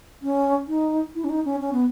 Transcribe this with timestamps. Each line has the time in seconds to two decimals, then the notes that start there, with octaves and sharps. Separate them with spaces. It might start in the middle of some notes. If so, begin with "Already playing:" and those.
0.22 C#4
0.68 D#4
1.15 E4
1.24 C#4
1.29 D#4
1.45 C#4
1.61 C#4
1.73 B3